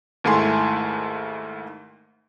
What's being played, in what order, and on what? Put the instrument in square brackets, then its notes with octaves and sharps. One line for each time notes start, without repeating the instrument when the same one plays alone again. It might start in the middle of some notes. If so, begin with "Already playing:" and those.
[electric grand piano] D#2 G#2 A3 E4 G#5 C6